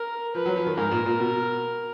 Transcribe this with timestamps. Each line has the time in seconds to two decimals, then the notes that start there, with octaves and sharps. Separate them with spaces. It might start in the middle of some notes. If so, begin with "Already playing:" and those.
Already playing: A#4
0.35 F3 B4
0.46 F#3
0.56 F3
0.67 D#3
0.77 G#2 A#4
0.91 A#2
1.06 A#2
1.20 B2